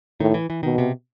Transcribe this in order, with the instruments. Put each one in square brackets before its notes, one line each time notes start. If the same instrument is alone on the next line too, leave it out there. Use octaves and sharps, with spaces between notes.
[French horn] A2 [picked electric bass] D#3
[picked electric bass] E3
E3
[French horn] B2 [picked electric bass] D#3
[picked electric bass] C3